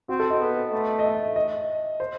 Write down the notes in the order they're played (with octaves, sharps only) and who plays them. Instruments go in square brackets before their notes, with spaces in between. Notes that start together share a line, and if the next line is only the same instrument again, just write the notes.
[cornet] C4 [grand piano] F#4
[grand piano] A4
D#5
[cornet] B3
A3
[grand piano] D#5
E5
D#5
C5